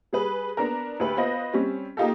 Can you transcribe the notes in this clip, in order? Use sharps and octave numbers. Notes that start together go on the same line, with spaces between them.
G3 G#4 B4
B3 D4 A#4
D2 G4 B4
B3 F4 B4 C5 D#5
G3 C4 C#4
A#3 D#4 F4 G4 A4